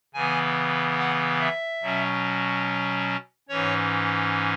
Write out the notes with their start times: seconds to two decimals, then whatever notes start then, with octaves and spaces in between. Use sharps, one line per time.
0.14 C#3 E3 B3 G#5
0.99 F#5
1.40 E5
1.82 B2 F#3 C#4
3.49 G#2 E3 C#4 C#5